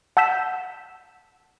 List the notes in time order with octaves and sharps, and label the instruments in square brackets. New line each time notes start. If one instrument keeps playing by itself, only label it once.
[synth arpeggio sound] F#5 A5 E6 G6 B6 E7